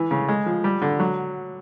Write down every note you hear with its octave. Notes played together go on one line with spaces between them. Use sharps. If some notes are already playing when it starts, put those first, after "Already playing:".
Already playing: E3
C#3
G#3
F3
G3
D3
F#3